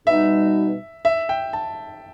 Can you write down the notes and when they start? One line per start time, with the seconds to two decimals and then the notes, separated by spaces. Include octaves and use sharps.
0.07 B2 G3 D#4 E5
1.05 E5
1.29 G5
1.53 A5